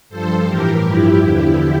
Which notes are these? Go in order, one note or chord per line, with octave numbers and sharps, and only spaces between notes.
G2 F3 A4 C5
A2 E3 G4 A#4
G2 F3 E4 G4
E2 D3 F3